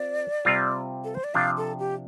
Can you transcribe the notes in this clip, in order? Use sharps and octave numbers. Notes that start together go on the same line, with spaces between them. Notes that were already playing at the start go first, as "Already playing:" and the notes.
Already playing: C4 F4 D5
C3 G3 C4 F4
A4
C5
D5
C3 F3 D4 F5
A4
G4